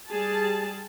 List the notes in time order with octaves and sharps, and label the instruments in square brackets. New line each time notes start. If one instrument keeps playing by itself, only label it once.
[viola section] G3 G#4 A5